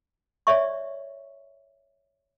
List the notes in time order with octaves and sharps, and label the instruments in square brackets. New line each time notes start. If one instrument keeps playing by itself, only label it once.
[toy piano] C#5 D5 E5 C#6